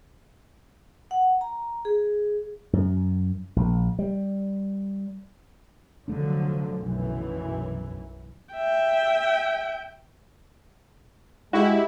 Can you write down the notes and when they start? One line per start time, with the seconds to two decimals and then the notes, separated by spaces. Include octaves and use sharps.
1.11 F#5
1.41 A#5
1.85 G#4
2.73 F#2
3.56 A#1
3.99 G3
6.08 F1 D3 F3 F#3 A3 D4
6.78 B1 F#2 E3
8.54 E5 G5
11.53 G#3 E4 F#4 G4